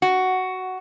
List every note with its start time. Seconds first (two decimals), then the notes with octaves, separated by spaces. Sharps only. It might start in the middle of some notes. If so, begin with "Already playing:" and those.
0.02 F#4